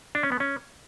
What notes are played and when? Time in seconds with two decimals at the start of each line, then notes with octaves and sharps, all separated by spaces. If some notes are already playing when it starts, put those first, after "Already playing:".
0.15 D4
0.23 C#4
0.32 B3
0.40 C#4